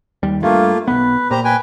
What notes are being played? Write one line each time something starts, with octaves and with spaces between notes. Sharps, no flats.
D#2 G3
G2 A3 A#3 F4
B1 B3 B4
A#2 G4 C5 A#5
B4 G5 G#5